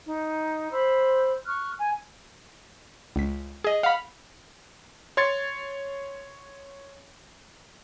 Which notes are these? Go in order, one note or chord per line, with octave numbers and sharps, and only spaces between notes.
D#4
C5 B5 E6
C#6 F6 F#6
G#5
C#2 B6
G#4 D#5
F5 F#5 B5
C#5 C6 G#6 A6 C#7